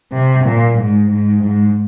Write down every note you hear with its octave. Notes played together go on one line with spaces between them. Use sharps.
C3
A#2
G#2
G#2
G#2